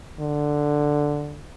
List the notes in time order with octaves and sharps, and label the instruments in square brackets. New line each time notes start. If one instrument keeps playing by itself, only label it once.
[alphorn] D3